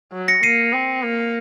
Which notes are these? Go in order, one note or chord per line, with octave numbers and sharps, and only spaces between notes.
F#3
A#6 C#7
A#3 C7 D#7
C4
A#3